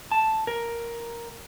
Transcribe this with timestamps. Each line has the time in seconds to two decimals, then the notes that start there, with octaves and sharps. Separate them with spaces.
0.12 A5
0.47 A#4